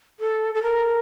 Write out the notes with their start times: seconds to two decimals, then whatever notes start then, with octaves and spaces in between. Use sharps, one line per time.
0.20 A4
0.55 A4
0.63 A#4